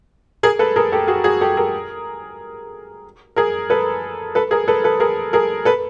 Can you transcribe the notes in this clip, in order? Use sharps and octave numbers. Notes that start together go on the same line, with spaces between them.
G#4 A#4
A4 B4
G#4 A#4
G4 A4
F#4 G#4
F#4 G#4
G4 A4
G#4 A#4
G#4 A#4
A4 B4
A4 B4
G#4 A#4
A4 B4
A4 B4
G#4 A#4
G#4 A#4
A4 B4